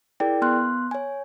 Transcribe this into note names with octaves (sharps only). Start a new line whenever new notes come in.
E4 G#4 A#4 D5 G5
B3 C6 F#6
C#5 G#5